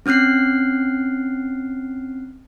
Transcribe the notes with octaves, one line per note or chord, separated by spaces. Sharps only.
C4 C#4 F6 F#6 C7